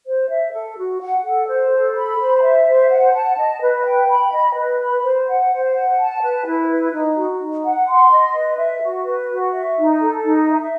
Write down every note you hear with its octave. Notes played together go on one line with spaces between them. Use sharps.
C5
E5
A4
F#4
F#5
A4
C5
A4
B5
C5
E5
C5
F#5
A5
D#5
B4
G5
B5
D#5
B4
B5
C5
F#5
C5
F#5
A5
B4
E4
B4
D#4
F#4
D#4
F#5
C6
D#5
B4
E5
F#4
B4
F#4
E5
D#4
A4
D#4
E5